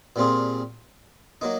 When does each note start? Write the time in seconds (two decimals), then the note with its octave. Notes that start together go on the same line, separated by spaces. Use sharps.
0.16 A#2 G3 C4 F4 G#4
1.41 F#3 A#3 D#4